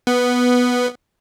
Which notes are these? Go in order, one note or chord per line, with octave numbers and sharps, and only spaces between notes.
B3